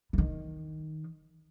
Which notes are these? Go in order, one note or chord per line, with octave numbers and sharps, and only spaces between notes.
E3
D#3